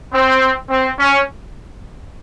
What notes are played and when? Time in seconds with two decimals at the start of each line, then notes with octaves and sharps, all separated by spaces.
0.14 C4
0.70 C4
0.99 C#4